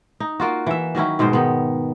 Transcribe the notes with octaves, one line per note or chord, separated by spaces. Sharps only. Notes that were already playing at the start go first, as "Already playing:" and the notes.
D#4
A#3 F4 F#4
E3 E5
D#3 F#3 C#4 E4
G#2 B2 G#3 C5
D#3 B3